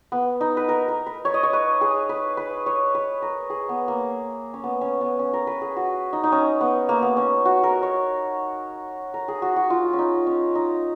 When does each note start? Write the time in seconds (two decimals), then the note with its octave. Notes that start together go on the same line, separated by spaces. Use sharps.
0.12 B3
0.41 D#4
0.57 B4
0.69 A#4
0.88 A#4
1.06 B4
1.25 C#5
1.34 D#5
1.43 C#5
1.53 B4
1.81 G#4
2.09 B4
2.37 B4
2.66 C#5
2.95 B4
3.22 A#4
3.50 G#4
3.69 B3
3.88 A#3
4.54 C#4
4.64 B3
4.81 C#4
5.01 B3
5.19 C#4
5.33 A#4
5.47 B4
5.62 G#4
5.76 F#4
6.13 D#4
6.23 D#4
6.32 C#4
6.61 B3
6.89 A#3
7.02 B3
7.17 C#4
7.45 F#4
7.63 A#4
7.83 C#5
9.14 A#4
9.28 G#4
9.42 F#4
9.56 F#4
9.70 F4
9.93 C#4
9.99 D#4
10.27 C#4
10.55 D#4